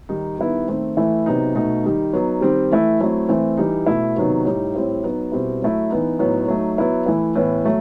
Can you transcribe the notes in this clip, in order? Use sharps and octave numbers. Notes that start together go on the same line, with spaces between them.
D#3 G3 D#4
D#3 G3 B3 E4
D#3 A3 C4
E3 A3 E4
C3 F#3 B3 D#4
B2 A3 D#4
D#3 G3 D#4
F#3 B3 D#4
D#3 G3 C4
E3 A3 E4
F#3 A3 C4 E4
E3 A3 C4
E3 G3 D#4
B2 A3 E4
C3 D#3 F#3 B3 D#4
A2 G3 D#4
A2 G3 C4 E4
F#3 B3 D#4
B2 G3 C4 E4
F#3 A3 E4
E3 B3 D#4
A2 F#3 B3 D#4
F#3 A3 D#4
F#3 B3 E4
E3 A3 E4
A2 E3 B3 E4
F#3 A3